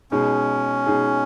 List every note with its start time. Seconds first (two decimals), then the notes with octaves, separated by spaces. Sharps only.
0.11 B2 G#3 C#4 D#4 G#4
0.86 B2 G#3 D#4 G#4